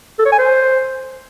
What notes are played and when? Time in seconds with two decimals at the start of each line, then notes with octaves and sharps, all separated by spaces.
0.19 A4
0.25 C#5
0.32 G#5
0.38 C5